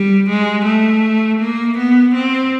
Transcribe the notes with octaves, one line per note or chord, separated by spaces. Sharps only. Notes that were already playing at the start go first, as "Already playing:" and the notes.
Already playing: G3
G#3
A3
A#3
B3
C4